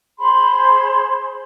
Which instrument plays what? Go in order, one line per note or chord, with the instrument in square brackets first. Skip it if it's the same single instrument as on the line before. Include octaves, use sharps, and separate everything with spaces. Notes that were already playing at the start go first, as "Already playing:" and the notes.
[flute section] G#4 C5 B5 C6